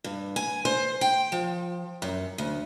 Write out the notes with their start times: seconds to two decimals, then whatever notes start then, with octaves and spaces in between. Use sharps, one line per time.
0.04 G2
0.36 G#5
0.65 C5
1.01 G5
1.32 F3
2.02 F#2
2.38 D2